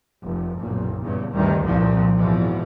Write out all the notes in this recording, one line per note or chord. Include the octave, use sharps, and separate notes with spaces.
F1
F#1 B1 A#2
E2 G2 A#2 C#3
D2 G2 C3 D#3 G3
C2 A#2 F3 C4
G#1 E2 B2 E3 F3